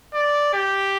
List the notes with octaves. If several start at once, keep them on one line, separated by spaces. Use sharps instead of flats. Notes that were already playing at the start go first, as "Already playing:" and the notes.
D5
G4